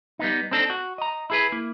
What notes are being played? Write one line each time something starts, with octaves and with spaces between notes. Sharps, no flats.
G3 B3 D#4
C4 D4 D#4 A4
F#4
D#5 A#5
E4 G#4 B4
A#3 E4